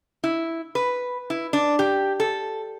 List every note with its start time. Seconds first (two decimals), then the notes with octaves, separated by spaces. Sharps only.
0.24 E4
0.75 B4
1.30 E4
1.53 D4
1.79 G4
2.20 A4